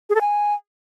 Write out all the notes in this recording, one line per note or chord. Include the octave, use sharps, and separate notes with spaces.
G#4
A4
G#5